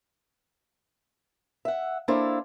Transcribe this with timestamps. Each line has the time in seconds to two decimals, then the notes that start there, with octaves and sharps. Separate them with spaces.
1.65 E5 F#5
2.08 A#3 D4 E4 A4 C5 F5